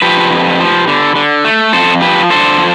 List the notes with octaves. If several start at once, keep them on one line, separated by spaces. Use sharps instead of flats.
F3 G4 B4
F2
F3
D3
D3
A3
F2 A4 C5
F3 G4 B4
D3 A4 C5
F3